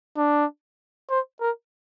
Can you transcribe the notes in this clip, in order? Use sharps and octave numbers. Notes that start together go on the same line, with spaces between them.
D4
C5
A#4